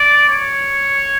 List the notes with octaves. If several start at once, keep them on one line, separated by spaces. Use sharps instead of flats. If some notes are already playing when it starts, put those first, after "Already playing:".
Already playing: D5
C#5